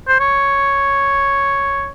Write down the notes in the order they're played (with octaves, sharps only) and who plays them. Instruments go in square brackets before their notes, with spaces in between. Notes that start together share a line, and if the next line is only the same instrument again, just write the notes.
[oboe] C5
C#5